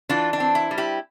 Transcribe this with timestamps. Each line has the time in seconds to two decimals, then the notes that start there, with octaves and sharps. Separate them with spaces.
0.09 E3 D4 F4
0.33 D4
0.40 C4
0.55 E4
0.71 G3
0.78 E4 G4